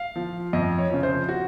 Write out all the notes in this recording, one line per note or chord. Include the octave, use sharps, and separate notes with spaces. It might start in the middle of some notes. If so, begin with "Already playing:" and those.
Already playing: F5
F3
F2 D#5
C#5
C#3 F3
C5
F#4